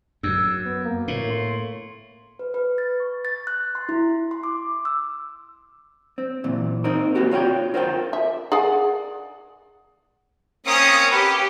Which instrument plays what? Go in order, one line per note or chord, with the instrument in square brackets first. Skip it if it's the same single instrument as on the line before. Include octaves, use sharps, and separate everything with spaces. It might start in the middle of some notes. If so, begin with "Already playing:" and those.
[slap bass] F#2 [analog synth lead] E6
[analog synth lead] B3
A#3
[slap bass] A2
[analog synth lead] C6
[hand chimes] B4
B4
A6
C#6
A6
F#6
C6
E4
C6
D6
E6
[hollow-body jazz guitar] C4
A#2 E3
C4 D#4 A#4
A#3 C4 F#4 G4
F4 C#5 F#5 G5
F4 A#4 C5 F#5 G5
[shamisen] E5
G#4 D5 F#5
[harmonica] A#3 C4 C#4 [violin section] D#6 C#7
[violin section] G4 [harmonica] B4